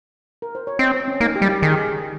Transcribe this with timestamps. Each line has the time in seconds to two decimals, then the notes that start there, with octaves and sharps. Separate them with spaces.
0.42 A#4
0.55 C5
0.67 C#5
0.79 C4 D#5
0.94 C5
1.08 C#4
1.21 A#3 D#4
1.36 G4
1.42 G3
1.49 G4
1.62 D#3 G#4
1.70 G4
1.79 G#4